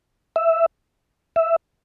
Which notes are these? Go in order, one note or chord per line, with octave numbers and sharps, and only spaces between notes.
E5
E5